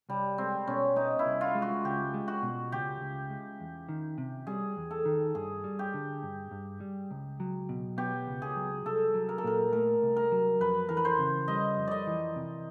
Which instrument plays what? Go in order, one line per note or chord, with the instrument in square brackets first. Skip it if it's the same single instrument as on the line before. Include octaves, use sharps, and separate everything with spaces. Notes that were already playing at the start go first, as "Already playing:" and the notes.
[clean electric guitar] C2 [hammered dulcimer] G3
[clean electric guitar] G#3 [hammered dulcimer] C4
[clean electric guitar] B2 [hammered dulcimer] C#4
[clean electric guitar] B3 [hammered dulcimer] D#4
[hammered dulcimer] E4
[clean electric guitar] C2
[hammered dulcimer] F4
[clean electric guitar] G#3
[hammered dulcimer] F#4
[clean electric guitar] C#2 [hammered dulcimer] G4
[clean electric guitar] G#3
[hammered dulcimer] F#4
[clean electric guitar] B2
[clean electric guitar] C#2 [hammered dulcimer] G4
[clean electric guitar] C#2
G#3
E2
D#3
C3
[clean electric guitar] G3 [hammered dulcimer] G#4
[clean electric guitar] E2
[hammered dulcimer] A4
[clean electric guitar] D#3
[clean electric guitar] G2 [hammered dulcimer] G#4
[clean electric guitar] G3
[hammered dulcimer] G4
[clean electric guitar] D3
G2
G2
G3
C#2
F#3
B2
[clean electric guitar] B3 [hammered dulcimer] G4
[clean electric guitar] C#2
[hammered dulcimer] G#4
[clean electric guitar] F#3
[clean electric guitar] C2 [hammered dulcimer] A4
[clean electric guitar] F#3
[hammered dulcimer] A#4
A4
[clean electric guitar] A#2 [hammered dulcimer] A#4
[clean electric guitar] A3 [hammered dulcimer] A#4
[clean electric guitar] C2
[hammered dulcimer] A#4
[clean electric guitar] F#3
[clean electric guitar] F2 [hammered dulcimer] B4
[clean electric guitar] E3 [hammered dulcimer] A#4
[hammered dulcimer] B4
C5
[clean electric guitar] C#3
[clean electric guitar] G3 [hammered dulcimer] D#5
[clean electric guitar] F2
[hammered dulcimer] D5 D#5
[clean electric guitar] E3
C3